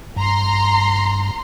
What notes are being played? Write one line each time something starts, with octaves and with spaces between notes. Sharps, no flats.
G2 A#5 C6